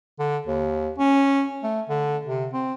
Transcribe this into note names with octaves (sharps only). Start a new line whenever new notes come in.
D3
D#2
C#4
A3
D3
C3
C4